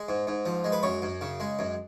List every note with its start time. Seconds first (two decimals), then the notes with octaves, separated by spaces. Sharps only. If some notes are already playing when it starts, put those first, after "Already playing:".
Already playing: G#3
0.09 G#2
0.27 G#2
0.46 F3
0.64 G#3
0.72 B4
0.83 F#2 C#5
1.02 F#2
1.21 C#3
1.40 G#3
1.59 F#2